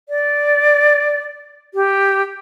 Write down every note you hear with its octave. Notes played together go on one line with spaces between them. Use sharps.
D5
G4